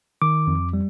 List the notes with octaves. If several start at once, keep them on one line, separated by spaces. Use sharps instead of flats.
D#3 D6
F2
G3